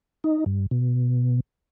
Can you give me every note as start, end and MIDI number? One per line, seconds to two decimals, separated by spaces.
0.24 0.44 63
0.46 0.66 43
0.71 1.40 47